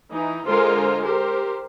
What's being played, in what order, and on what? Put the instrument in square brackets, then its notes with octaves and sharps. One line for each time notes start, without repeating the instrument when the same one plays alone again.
[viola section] E3 D#4
D3 G#3 F4 A#4 C5
G4 A#4 C5